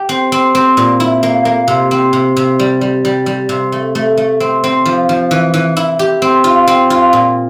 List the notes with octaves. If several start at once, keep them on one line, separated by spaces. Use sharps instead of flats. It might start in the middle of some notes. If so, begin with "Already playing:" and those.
Already playing: G4
C4
C4
C4
A#2
E4
A#3
A#3
C3
C4
C3
C3
G3
G3
G3
G3
C3
A3
A3
A3
C4
C4
F3
F3
E3
E3
E4
G4
C4
F4
C4
F4
A#2